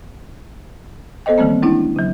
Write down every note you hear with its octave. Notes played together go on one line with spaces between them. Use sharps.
B3 A4 C5 D#5 G5
D#3 E3 G3 A#3 C4
G#3 C#4 D4 E4
C#3 F#3